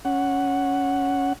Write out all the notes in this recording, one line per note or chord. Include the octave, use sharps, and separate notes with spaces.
C#4 F#5